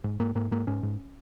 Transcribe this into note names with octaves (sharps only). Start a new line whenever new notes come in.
G#2
G#2 A#3
G#2 A#3
G#2 A#3
G#2 C#4
G#2